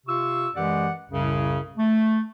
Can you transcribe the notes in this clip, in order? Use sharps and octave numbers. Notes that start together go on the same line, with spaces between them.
C3 F4 C#6 E6
F#2 E3 G#3 G4 D5 F#5
C2 F#2 A2 C#3
A3